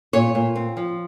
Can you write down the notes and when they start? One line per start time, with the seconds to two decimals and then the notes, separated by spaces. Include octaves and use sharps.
0.13 A#2 C#5
0.35 A#2
0.56 C4
0.77 F3